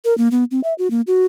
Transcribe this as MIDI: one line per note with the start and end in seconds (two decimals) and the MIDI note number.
0.05 0.16 70
0.18 0.28 58
0.31 0.44 59
0.51 0.60 60
0.64 0.74 76
0.78 0.90 66
0.91 1.01 58
1.07 1.26 66